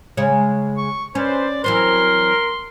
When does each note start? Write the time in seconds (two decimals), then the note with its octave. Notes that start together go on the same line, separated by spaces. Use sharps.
0.17 C#3 G#3 C#5
0.77 C#6
1.15 C#4 B4 C5 D5
1.64 E3 F#3 C4 A#4 C6